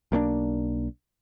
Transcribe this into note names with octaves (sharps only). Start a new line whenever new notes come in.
B1 A#3 C#4 D4